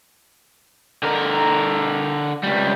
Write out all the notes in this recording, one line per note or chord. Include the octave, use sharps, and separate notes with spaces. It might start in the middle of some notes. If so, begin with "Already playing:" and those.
D3 A#4
C#2 G3